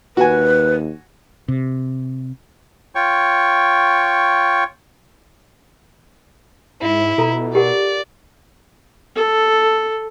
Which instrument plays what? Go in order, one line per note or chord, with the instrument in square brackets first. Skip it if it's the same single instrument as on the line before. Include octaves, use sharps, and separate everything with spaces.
[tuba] D#2 [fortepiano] F#4 G#5 [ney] B4
[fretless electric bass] C3
[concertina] F4 C#5 G5 C#6
[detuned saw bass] G#2 [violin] E4 [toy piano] E5
[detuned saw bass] B2 [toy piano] F4 A4 A#5
[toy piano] G4 A#4 F#5 [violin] D5
[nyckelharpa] A4